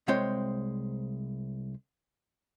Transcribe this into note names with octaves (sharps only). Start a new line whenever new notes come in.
C2 G#3 C4 C#5 G5